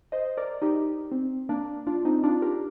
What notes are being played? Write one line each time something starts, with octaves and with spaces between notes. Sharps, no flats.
C5 D#5
A#4 D5
D#4 G4
C4
A#3 D4
D4 F4
C4 D#4
D4 F4
G4 A#4